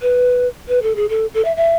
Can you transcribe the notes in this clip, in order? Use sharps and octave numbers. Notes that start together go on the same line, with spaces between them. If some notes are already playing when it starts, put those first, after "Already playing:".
B4
B4
A4
G#4
A4
A4
E5
E5